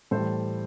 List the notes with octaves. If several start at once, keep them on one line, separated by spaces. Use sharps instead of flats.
A2 E3 G3 A4 C5